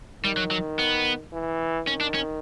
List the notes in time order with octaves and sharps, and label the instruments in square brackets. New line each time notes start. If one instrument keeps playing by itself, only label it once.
[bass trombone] D#3 [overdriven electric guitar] G3
[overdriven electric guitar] F#3
F#3
B3
[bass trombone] E3
[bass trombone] D#3 [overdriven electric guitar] C#4
[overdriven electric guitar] D4
C#4